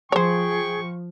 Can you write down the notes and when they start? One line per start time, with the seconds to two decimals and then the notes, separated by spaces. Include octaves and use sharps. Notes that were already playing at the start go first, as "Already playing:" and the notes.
0.12 F3 G#4 C5 C#5 G5 C#6